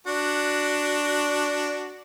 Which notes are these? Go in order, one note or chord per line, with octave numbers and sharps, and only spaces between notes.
D4 F#4